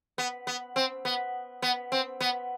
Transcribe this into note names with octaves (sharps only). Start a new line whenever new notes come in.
B3
B3
C4
B3
B3
C4
B3